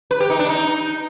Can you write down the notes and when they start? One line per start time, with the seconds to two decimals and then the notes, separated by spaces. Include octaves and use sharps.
0.11 B4
0.20 G4
0.30 D#4
0.39 D4
0.49 D#4